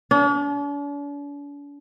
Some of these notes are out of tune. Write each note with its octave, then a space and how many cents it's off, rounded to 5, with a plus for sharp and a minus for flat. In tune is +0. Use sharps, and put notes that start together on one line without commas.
D4 -45